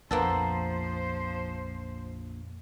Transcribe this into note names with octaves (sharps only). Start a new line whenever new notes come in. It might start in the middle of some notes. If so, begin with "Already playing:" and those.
A#1 F2 F3 A#3 B3 A4 C5 A6